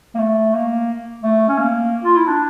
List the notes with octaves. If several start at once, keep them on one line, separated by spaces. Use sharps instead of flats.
A#3
A3
A#3
A3
C#4
A#3
F4
E4
D4